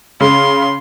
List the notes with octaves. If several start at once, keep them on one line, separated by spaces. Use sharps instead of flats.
C#3 C6